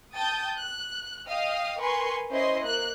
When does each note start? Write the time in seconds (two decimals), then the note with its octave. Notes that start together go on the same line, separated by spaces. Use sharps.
0.15 G5 A5 D#6 G6 A6
0.58 F#6
1.28 D#5 F5 G5 D#6 F6
1.80 A#4 B4 G#5 C6 C#6
2.30 C#4 E4 C5 D#5 C6
2.63 A#3 F#6